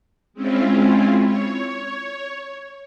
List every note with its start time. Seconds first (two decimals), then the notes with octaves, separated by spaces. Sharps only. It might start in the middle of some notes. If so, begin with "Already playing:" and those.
0.33 G#3 C4 C#4 E4 F4
1.21 C#5